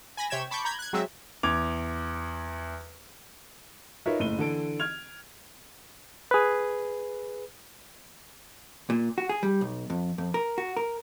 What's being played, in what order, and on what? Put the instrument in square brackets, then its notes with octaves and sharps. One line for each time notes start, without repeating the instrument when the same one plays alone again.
[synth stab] G#5 B5 A#6
C3 C#5 G5 G#6 B6 E7
A5 B5 C#6 D6 G6
A#5 B5 G6 G#6
F#6 G#6
F#3 G#3 C4 E5
[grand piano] E2 D6 G#6 F7
[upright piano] D#4 F4 A#4 B4 C#5 E5
F#1 A2 D#7 G7
D3 E3 A4 D7
F6 G#6 F7
[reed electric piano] G#4 B4
[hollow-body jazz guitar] A#2
F#4
G#4
G3
B1
F2
F2
A#4
F#4
A#4